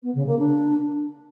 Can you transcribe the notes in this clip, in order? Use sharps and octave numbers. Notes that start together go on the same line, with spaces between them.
B3
C#3
A#3
D4